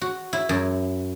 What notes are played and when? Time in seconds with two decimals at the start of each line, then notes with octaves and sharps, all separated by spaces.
0.02 F#4
0.33 E4
0.49 F#2